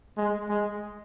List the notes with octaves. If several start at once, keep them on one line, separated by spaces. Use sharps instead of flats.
G#3
G#3